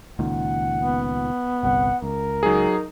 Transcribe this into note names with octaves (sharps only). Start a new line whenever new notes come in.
C#2 A#2 D#3 F#5
B3
G1 C2 F#5
C#2 A#4
F#3 D#4 G#4